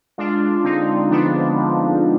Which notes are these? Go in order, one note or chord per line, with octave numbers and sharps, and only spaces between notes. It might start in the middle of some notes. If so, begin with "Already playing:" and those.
G#3 D4 F4
D3 C4 D#4
F3 B3 D4
F3